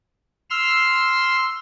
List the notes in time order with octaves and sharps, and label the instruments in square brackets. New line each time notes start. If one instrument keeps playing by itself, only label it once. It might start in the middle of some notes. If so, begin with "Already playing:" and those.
[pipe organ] C6 E6 F6